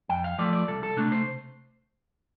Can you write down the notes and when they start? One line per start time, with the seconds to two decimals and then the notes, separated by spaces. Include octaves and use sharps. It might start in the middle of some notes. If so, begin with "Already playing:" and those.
0.09 F2 G5
0.24 F5
0.39 F3 A3 D5
0.53 D5
0.68 C2 A4
0.83 A4
0.97 C3 A3 D4
1.12 C5